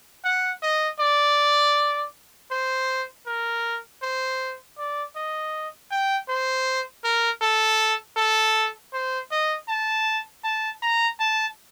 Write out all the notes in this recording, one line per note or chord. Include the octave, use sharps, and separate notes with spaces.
F#5
D#5
D5
C5
A#4
C5
D5
D#5
G5
C5
A#4
A4
A4
C5
D#5
A5
A5
A#5
A5